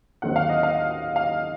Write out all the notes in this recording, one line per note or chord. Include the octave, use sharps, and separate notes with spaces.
D#2 D#3 F#3 C4 F#5
F5
D#5
F5
F5